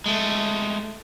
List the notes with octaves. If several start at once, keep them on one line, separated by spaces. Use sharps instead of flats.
G#3 A3